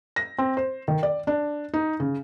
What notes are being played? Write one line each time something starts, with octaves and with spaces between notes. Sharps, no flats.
A#6
C4
C5
D#3
D5
D4
D#4
C#3